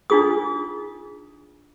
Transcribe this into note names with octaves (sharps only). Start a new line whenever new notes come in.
D4 D#4 F4 G#4 D#6